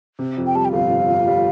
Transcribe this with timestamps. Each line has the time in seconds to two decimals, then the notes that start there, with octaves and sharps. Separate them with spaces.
0.19 C3
0.37 F2
0.46 G5
0.55 G3 A5
0.65 G5
0.73 G1 F5
0.91 C3
1.10 F2
1.28 G3